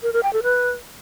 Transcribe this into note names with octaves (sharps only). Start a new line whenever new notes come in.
A#4
A#4
G5
A4
B4